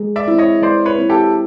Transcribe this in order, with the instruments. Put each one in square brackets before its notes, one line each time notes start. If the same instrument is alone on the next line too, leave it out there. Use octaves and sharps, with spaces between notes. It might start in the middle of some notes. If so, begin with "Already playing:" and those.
Already playing: [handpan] G#3
[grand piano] D5 E5
[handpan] C4 E4
[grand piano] C#5 D#5
[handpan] G#3 [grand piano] C5 D5
[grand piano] B4 C#5
[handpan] C4 E4
[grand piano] G4 A4